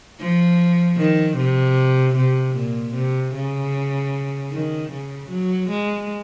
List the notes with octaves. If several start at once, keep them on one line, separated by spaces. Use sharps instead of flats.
F3
D#3
C3
C3
A#2
C3
C#3
D#3
C#3
F#3
G#3